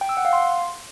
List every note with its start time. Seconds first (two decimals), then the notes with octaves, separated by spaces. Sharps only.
0.01 G5
0.09 E6
0.17 F#5
0.25 F5
0.33 C6